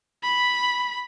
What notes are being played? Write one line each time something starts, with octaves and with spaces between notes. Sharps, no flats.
B5